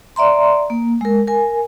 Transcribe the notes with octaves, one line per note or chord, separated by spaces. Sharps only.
D5 E5 A#5 C6
A#3
G#3 A#4
A#4 G#5